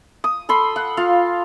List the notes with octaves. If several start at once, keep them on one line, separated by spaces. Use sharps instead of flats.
D#6
A4 B5 C6
F#5
F4 F5